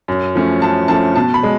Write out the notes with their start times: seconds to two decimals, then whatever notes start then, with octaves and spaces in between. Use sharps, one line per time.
0.08 F#2
0.35 F3 A3 C#4
0.62 F#2 A5
0.88 F3 A3 C#4 A5
1.15 B2 A5
1.34 B5
1.43 G#3